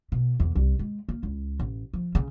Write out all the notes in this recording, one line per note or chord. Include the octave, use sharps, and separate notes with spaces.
B2
E2
C2
G#3
A#3
C#2
A1
F3
C#3